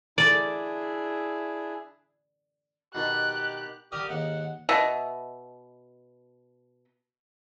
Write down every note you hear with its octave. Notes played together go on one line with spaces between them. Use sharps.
D4 E4 G#4 D5
B2 D#3 D4 G4 F#6
D3 G3 G4 A#4 D#6 F6
D#2 G#2 D#3 F#5
B2 D#5 E5